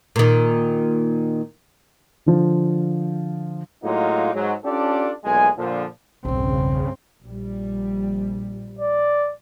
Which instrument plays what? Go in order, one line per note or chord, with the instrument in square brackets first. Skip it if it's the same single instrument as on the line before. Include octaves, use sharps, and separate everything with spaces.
[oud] A#2 D#3
[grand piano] D3 F3
[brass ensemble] A2 F#3 G#3 A#3 D#4 F4
G#2 F#3
C#4 D4 F4 G4 A4 D5
B1 E2 A#2 G#3 G#5
A#2 D3 F3
[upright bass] B1 E2 [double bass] G2 C4 [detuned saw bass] C#3
[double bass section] A#1 G3
[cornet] D5